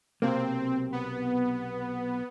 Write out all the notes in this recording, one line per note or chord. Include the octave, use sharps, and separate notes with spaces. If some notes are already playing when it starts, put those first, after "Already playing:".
B1 C3 A#3 C4
B3